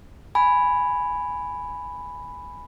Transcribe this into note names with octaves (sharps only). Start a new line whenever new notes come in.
G#5 B5